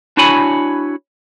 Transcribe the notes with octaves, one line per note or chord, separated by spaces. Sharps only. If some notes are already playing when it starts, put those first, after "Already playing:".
D4 E4 F#4 C#5 G#5 B5